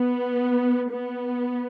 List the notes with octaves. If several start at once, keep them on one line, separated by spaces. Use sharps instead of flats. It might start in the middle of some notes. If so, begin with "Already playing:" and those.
Already playing: B3
B3